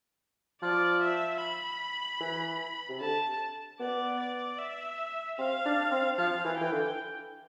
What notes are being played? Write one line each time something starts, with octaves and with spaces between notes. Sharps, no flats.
F3 D5
E5
B5
E3
C3
D3 A5
B3 D5
D5
E5
C4 F5
D4
C4
F3 F5
E3
E3 G5
D3